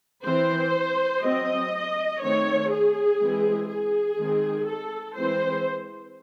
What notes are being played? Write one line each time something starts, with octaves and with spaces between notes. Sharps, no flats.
E3 C4 C5
F#3 C4 D#5
D#3 A3 C4 C#5
G#4
E3 G#3 C4
G#4
D#3 G#3 C4
A4
E3 G#3 C4 C5